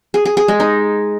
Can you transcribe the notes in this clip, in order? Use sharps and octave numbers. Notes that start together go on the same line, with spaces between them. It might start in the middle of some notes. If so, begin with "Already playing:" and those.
G#4
G#4
G#4
G#3
D#4